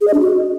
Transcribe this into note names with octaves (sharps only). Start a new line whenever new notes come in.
G#4
D#5
D4
F#4